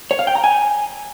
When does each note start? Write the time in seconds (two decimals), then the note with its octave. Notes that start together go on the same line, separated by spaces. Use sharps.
0.11 C#5
0.19 F5
0.27 G5
0.35 A#5
0.44 G#5